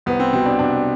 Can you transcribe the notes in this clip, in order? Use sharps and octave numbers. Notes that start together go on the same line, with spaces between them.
C2 B3
C4
B2 C4
D4
C2 D4